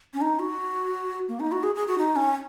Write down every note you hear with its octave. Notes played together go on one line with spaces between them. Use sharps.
C#4
D#4
F#4
A#3
D#4
F#4
G#4
G#4
F#4
D#4
C#4